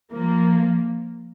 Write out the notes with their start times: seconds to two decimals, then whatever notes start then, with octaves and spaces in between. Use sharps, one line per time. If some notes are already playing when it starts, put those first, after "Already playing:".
0.13 F3 A#3